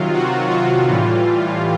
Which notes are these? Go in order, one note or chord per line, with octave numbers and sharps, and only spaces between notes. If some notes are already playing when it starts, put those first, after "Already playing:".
Already playing: C3 D#3 F#3 F4
F#4
F4
A2 E3 G3